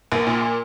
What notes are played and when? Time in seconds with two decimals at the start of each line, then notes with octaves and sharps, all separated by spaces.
0.12 A#1 A#3
0.27 A#2